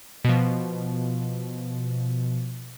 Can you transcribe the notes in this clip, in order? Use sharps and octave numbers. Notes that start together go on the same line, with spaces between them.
B2 F3